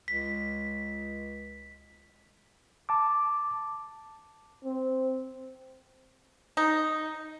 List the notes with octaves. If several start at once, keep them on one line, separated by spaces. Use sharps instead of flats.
C#2 B6
A5 D6
C4
D#4